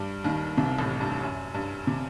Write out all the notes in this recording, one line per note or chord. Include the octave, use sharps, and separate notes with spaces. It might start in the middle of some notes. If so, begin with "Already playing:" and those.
Already playing: G2 G3
D#2 D#3
C2 C3
A1 A2
G2
F#2
G2
C3